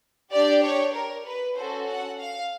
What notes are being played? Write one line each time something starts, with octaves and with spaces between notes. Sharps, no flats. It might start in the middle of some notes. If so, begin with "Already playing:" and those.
D4 G4 D5
C#5
A#4
B4
C#4 F#4 A4 C5
F#5
F5